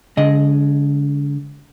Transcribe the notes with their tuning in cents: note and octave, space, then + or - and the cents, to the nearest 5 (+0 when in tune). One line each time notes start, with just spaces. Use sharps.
D3 -40 G#3 +0 D#5 +0